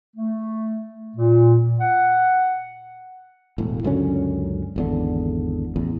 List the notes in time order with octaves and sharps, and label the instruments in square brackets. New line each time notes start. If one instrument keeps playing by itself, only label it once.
[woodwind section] A3
A#2
F#5
[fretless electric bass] E1 A2
C#2 F#2 D3 C#4
G#1 E2 D3
A1 E2